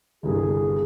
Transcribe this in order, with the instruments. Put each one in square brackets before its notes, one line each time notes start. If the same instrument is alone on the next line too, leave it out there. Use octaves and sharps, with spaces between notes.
[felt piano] G1 C2 G2 [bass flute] G#4